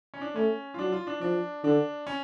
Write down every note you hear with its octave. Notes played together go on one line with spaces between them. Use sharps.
C#4
D4
A3 C#4
F4
F#3 D4
F4
D4
F3 D4
D3 D4
C#4